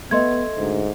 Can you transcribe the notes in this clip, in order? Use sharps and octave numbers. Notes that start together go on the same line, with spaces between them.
A3 B3 D#5 C6 G#6
D2 G#2